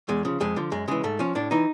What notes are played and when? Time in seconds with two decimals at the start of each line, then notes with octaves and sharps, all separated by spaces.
0.09 E2 G#3
0.25 C#3 F3
0.40 F2 G#3
0.56 D3 F3
0.72 F#2 G#3
0.88 C#3 E3 G#3
1.04 G#2 A3
1.19 F3 C#4
1.35 A2 D4
1.51 E3 D#4